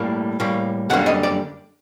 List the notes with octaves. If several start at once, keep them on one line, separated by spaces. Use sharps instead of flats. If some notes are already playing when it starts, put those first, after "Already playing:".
Already playing: A2 G3 A#3
A2 G3 A#3
F#2 D3 G3 A#3 F#5
D#5
D5